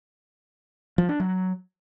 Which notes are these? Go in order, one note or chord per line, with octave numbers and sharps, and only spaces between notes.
F3
D4
F#3